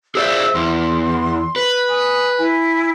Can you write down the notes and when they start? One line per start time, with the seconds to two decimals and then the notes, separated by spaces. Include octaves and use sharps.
0.15 G#4 C5 D5 E5 F5 E6
0.55 E2 C6
1.56 B4
1.89 G#5 D#6
2.38 E4 G#5